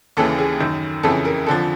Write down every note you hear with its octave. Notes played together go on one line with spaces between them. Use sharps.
D#2 C#3 E3 A4
G#4
F#2 D#3
F2 C#3 E3 A4
A#4
F2 D3 F3 A4